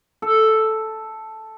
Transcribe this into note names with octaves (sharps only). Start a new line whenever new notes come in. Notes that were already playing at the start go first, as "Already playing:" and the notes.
A4